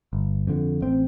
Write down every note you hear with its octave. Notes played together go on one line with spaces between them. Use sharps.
G1
F2 D3
A1 C4